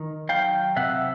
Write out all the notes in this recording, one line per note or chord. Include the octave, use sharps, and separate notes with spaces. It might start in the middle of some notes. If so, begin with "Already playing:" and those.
Already playing: D#3
F#3 F5 G5
C3 E5 F#5